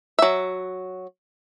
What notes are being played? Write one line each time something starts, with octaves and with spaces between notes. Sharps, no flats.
F#3 E5